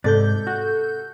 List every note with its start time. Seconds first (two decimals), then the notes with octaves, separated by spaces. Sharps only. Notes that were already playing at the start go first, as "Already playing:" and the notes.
0.04 G#2 C3 A4 D5 G6
0.47 F#4